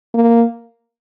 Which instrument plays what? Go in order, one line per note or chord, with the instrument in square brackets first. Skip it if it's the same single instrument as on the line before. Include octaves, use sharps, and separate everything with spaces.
[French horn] A#3